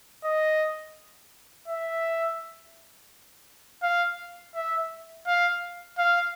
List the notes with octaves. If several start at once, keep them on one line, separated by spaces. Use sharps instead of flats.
D#5
E5
F5
E5
F5
F5